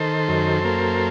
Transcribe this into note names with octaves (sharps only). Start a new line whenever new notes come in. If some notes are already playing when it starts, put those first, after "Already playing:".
Already playing: D#3 A4 C5
F#2
A#3